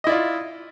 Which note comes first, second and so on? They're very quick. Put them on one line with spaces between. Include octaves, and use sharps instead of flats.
D#5 E4 D5 F4